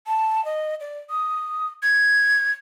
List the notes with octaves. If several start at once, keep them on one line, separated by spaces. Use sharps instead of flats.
A5
D#5
D5
D#6
G#6